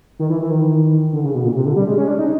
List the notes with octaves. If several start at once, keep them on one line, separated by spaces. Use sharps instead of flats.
D#3
E3
E3
D#3
D3
C#3
B2
A#2
C3
D3
G3
G#3
C#4
D4
D#4